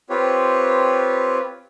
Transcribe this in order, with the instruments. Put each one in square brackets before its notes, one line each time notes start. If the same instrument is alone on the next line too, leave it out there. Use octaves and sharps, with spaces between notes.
[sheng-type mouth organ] C4 F4 G4 B4 C#5